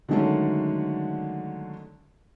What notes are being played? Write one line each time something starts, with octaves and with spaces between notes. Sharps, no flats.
D3 D#3 F#3 G#3 A3 C#4